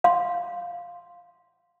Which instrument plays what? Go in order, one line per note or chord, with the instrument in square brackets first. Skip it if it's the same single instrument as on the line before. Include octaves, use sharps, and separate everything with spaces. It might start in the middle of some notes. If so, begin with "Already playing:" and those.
[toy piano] F5 C6